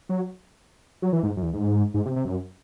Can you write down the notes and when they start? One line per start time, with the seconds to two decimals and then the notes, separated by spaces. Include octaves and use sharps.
0.09 F#3
1.02 F#3
1.13 E3
1.23 G#2
1.37 F#2
1.43 E2
1.54 G#2
1.94 G#2
2.06 C3
2.16 C3
2.25 F#2